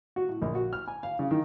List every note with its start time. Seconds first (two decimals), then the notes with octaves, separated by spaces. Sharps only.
0.16 F#4
0.28 A2
0.42 A#1
0.55 F#4
0.73 F6
0.87 G#5
1.03 F5
1.19 C#3
1.31 D#3